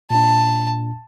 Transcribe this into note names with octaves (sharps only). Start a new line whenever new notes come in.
A#2 D4 A5